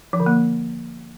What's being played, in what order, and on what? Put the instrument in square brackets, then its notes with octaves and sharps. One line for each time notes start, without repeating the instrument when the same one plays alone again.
[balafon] F3
D3
A#3